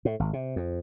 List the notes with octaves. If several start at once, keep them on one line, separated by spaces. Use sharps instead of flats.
A2
G#1
C3
F2